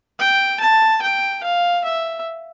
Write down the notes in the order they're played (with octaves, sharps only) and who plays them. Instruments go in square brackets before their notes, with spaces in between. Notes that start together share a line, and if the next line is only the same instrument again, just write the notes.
[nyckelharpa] G5
A5
G5
F5
E5